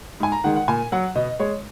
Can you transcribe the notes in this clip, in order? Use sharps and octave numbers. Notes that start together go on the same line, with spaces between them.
G#2 G#5
A#5
D#3 G#3 F#5
F#5
A#2 G#5
F#3 F#5
B2 D#5
G#3 C#5